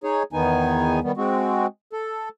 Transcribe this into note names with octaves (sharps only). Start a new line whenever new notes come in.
D#4 G#4 C#5
E2 D#3 B3 D#4 G#5
D#3 G3 B3
G#3 C4 F#4
A4